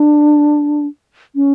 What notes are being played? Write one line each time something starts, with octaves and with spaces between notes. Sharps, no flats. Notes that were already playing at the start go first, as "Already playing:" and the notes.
Already playing: D4
C#4